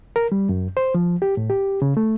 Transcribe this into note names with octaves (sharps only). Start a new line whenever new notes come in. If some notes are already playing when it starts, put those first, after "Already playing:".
A#4
G3
F#2
C5
F3
G4
A2
G4
C#3
A3